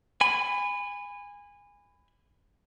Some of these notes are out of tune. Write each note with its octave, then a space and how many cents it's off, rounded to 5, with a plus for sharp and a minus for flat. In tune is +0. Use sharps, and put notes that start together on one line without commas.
G#5 -20 B5 +15